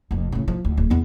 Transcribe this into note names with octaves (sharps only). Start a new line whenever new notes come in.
F1 F2
A2 C#3
F3
D2
D1
E2 B3